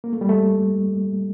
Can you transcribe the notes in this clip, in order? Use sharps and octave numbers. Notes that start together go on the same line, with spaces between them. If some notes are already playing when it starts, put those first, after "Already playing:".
A#3
A3
G3
A3